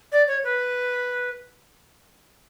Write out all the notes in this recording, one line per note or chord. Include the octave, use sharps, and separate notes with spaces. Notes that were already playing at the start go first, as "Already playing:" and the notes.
D5
C#5
B4